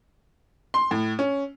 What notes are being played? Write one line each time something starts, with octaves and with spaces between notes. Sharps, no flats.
C6
A2
C#4